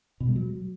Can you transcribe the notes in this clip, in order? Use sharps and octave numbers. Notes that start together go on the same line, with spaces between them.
B2
G#3
F#3